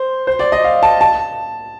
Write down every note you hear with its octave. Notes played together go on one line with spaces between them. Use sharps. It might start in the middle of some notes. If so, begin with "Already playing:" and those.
Already playing: C5
C5
D5
D#5
F5
A5
A5